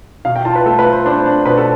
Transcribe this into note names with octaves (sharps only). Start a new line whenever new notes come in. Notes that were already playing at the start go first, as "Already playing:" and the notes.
B2 F5
G5
F4 A5
B4
A3 A4
B4
F4
C5
D4 C5
D4
B2 B4
A4